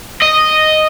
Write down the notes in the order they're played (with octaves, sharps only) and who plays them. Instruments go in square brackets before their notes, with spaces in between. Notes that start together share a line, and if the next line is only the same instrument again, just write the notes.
[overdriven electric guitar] D#5